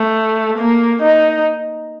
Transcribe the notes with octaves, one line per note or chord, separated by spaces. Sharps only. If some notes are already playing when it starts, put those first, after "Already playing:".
Already playing: A3
A#3
D#4